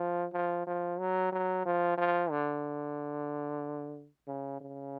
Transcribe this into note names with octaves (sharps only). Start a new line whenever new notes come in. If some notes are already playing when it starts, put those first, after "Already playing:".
Already playing: F3
F3
F3
F#3
F#3
F3
F3
D3
C#3
C#3